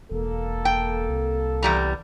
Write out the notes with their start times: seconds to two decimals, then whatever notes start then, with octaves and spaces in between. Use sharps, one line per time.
0.11 E1 A#3 A4
0.65 G5
1.09 C2
1.63 E2 G3 A#5